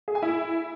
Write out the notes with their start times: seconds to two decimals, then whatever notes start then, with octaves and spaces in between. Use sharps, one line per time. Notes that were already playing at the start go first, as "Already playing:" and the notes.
0.08 G#4
0.15 G#5
0.22 E4